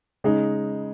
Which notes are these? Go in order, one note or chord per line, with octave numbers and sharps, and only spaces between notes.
C#3 G#3 D#4